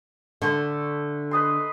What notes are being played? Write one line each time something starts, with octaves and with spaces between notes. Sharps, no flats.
D3 A3
B4 D#5 C6